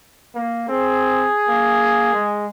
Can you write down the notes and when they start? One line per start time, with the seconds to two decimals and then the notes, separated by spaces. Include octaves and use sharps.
0.35 A#3
0.69 C4 G#4
1.48 A#3
2.14 G#3